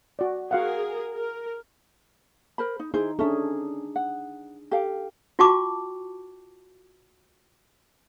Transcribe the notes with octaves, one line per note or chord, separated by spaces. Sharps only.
F#4 D5
F#4 G#4 A#4 F5 F#5
A#4
A#4 C5 B5
D#4
D#4 E4 G#4 C5
C#4 D4 G#4 A4 E5
F#5
G4 A4 F5
F4 F#4 G5 A5 C#6 D6